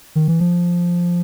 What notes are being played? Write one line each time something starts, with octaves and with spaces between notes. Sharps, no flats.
D#3
E3
F3